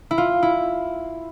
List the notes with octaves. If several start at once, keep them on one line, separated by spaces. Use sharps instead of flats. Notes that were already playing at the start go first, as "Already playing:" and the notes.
E4
F4
E4